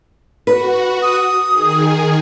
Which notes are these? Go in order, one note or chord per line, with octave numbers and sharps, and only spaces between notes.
F#4 B4
D#6
D#3 G#4